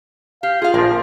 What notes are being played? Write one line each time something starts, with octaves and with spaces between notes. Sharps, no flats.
G4 F5
F4 G#4 F5
A#1 F3 A#3